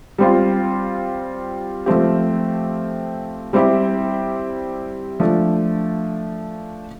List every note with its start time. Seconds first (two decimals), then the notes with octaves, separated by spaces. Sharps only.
0.18 G3 C4 F4
1.86 F3 A3 C4 G4
3.53 G3 C4 E4 G4
5.20 F3 A3 D4